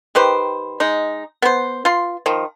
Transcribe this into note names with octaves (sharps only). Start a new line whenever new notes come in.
D#3 G4 B4 C5
G#3 D#4
B3 C5
F4 C6
D#3 F3